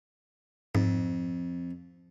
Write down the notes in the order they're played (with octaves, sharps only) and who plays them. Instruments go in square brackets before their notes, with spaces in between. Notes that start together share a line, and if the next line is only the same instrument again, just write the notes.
[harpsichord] F2 [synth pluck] G#2